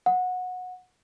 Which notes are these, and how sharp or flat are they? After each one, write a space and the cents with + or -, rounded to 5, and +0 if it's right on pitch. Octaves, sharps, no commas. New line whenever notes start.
F#5 -20